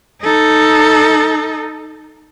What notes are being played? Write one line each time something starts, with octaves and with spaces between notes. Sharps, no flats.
D#4 A4